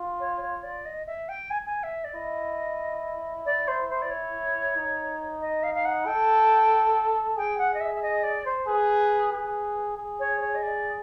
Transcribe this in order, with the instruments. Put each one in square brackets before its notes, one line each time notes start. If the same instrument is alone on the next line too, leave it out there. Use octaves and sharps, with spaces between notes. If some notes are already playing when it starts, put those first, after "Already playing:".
Already playing: [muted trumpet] F4
[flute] C#5
C#5
D5
D#5
E5
G5
G#5
G#5
E5
D5
[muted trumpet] E4 [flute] D#5
[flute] D5
C5
C5
D5
C#5
[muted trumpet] D#4
[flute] D#5
F5
F5
F#5
[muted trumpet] A4 [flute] G5
[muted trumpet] G#4 [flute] G5
[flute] F#5
D#5
E5
E5
D#5
D5
C5
[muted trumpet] G#4 [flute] B4
[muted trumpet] G#4
G#4
[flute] C#5
C#5
D#5
D5